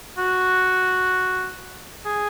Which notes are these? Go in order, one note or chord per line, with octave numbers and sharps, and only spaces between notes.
F#4
G#4